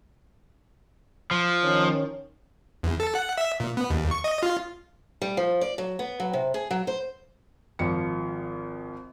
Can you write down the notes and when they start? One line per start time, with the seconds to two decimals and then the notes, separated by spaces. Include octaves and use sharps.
1.31 F3
1.64 D#3 C#4 C#5
2.83 E2
3.00 A4
3.15 F#5
3.38 E5
3.60 A#2
3.77 B3
3.90 D#2
4.11 C#6
4.24 D#5
4.43 F4
5.22 G3
5.37 F3
5.61 D5
5.78 F#3
5.99 B3
6.20 F#3
6.33 C3
6.54 G#4
6.71 F#3
6.87 C5
7.79 G#1 F3 C#7